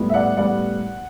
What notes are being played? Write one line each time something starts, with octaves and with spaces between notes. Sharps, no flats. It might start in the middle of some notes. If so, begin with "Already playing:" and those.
Already playing: A2 G3 B3
E5
D5 F#5
A2 G3 B3 D5 F#5